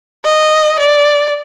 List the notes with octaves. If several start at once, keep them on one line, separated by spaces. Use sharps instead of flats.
D#5
D5